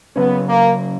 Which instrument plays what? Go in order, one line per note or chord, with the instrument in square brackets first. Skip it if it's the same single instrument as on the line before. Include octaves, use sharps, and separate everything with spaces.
[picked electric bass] C#3 F#3 C#4 [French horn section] B3
[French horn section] A#3